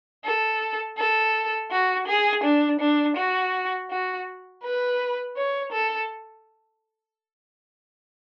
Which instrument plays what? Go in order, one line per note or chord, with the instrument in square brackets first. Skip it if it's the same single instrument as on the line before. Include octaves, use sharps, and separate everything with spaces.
[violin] A4
A4
F#4
G#4
D4
D4
F#4
F#4
B4
C#5
A4